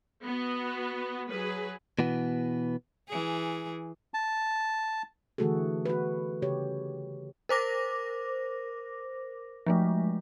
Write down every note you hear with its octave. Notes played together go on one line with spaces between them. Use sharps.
B3 F#4
F#3 G#4 B4
B2 E3 B3
E3 G#4
A5
D3 E3 A3 F#4 G#4 A4
F#4 B4
C#3 G4 C#5
A#4 C5 D6 A#6
F3 G#3 A3